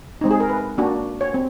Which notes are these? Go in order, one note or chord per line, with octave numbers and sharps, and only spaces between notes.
G#3 C4 D#4
G#4
A#4
B4
A#3 D4 F#4
C#5
C4